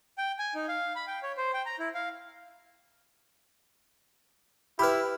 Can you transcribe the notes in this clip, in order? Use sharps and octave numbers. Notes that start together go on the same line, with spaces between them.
G5
G#5
D#4
F5
B5
G5
C#5
C5
G5
A#5
E4
F5
E4 G4 B4 B5 F6